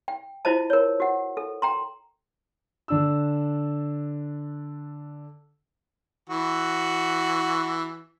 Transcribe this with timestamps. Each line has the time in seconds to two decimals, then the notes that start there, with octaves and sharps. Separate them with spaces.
0.08 G5
0.45 E4 F4 C5 D#5 A5
0.70 A#4 C#5
1.00 F#4 F#5
1.37 A4
1.62 G5 A#5 C6
2.88 D3 D4 E6
6.30 E3 F#4